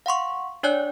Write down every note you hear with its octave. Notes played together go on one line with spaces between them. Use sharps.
F5 F#5 C6 C#6
D4 C#5 D5 G#5 F#6